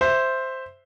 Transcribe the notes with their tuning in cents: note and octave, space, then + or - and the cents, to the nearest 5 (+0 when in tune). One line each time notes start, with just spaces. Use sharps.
C5 +0 E5 +0